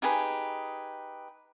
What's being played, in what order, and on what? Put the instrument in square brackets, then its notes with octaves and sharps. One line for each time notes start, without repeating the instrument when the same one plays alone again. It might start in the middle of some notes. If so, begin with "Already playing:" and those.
[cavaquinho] D#4 G4 G#4 B4